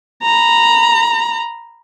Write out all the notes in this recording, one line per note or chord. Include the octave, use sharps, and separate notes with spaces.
A#5 B5